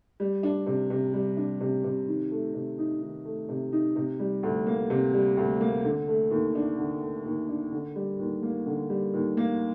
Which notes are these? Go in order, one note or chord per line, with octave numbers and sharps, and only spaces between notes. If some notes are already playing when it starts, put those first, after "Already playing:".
G3
D4
C3
C3
G3
D4
C3
C3
D#3
A3
C3
D#4
D#3
A3
C3
D#4
C3
G3
D2
A#3
C3
G3
D2
A#3
D3
A3
D#2
D4
D3
A3
D#2
D4
D3
G3
D#2
A#3
D3
G3
D#2
A#3